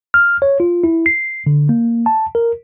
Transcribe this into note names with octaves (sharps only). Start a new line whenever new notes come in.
F6
C#5
F4
E4
C7
D3
A#3
A5
A#4